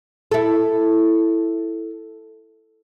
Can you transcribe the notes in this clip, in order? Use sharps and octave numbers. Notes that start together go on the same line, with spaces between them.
E4 A4